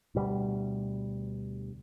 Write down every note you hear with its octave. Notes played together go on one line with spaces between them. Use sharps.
D2 B2 G3